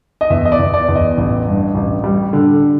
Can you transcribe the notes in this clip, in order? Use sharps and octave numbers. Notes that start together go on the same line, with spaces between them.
D#5
E2 E5
D#5
D5
E2
D5
E2
D#5
A1
G2
A1
G3
D3